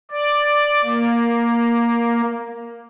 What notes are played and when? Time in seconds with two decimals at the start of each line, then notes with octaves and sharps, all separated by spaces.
0.11 D5
0.84 A#3